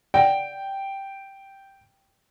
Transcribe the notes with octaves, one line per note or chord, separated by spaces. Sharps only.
D5 F#5 G5